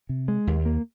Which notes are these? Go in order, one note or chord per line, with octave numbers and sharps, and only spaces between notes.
C3
G#3
D#2
A#3